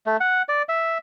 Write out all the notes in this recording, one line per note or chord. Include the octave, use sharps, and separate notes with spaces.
A3
F#5
D5
E5